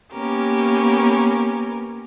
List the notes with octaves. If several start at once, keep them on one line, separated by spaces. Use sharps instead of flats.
A#3 B3 C#4 G4 A#4